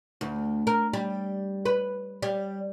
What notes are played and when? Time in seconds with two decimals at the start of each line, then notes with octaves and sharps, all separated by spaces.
0.21 D2
0.67 A#4
0.93 G3
1.65 B4
2.22 G3